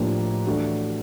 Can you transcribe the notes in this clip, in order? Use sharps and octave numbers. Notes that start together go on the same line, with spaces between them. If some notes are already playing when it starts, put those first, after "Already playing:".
Already playing: A2 F3 A#3 D4 G4
E3 A3 D4 F#4